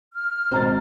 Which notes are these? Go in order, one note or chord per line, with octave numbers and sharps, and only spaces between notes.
F6
G#1 B2 C4 C5 A#5 A6